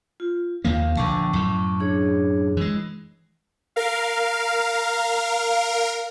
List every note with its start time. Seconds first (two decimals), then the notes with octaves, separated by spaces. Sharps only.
0.20 F4
0.65 D#2 D#3 A#3 F5
0.97 A#1 D3 A5 C#6 D6
1.33 F#2 A2
1.80 D4 G#4 C#5
2.57 E3 G#3
3.76 A#4 F5